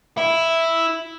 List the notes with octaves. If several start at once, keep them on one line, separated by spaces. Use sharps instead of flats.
E4